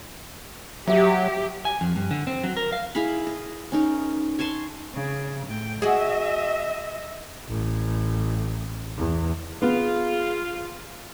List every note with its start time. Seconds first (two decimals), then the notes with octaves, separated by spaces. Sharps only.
0.88 F#3 G4 E5 D6
1.65 G#5
1.81 F2
1.96 G2
2.11 D3
2.27 C4
2.43 F#3
2.57 A#4
2.72 F5
2.95 E4 G#4 F5 B5
3.27 D#5
3.72 C#4 D#4 A#4
4.39 C#5 G#5 A5 C6
4.94 C#3
5.46 A2 G5
5.82 F#4 G#4 D#5 E5
7.49 A1
8.98 E2
9.62 B3 F4 G#4